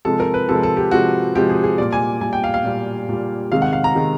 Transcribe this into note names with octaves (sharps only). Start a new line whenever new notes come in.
C3 F3 G#3 A4
A#4
B4
C3 F3 G#3 A4
A4
G4
C3 F3 G#3 F#4
C3 F3 G#3 G4
G#4
G#4
A#2 G3 D5
G#5
A#2 G3 G#5
G5
F5
F5
A#2 G3
A#2 G3
C3 D#3 G#3 F5
F#5
F5
A#5
C3 D#3 G#3